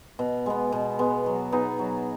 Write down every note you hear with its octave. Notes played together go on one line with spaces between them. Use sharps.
B2
G#3 B3
B2
G#3 B3
F#3
B3 D#4 G#4
F#3